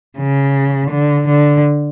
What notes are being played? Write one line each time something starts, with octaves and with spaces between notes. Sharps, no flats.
C#3
D3
D3